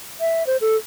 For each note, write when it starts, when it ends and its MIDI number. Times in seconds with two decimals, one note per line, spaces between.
0.20 0.46 76
0.47 0.57 72
0.61 0.76 69